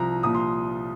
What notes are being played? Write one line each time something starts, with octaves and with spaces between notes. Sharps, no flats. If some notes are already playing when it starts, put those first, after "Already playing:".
Already playing: C2 F3 A#5
C2 A#2 F3 D#6
C6